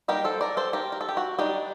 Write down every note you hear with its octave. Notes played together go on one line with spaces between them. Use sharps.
G3 A#3 D#4 G4 A#4
A4 C5
A#4 D5
A4 C5
G4 A#4
A#4
A4
G4
F#4
G3 D4 D#4 G4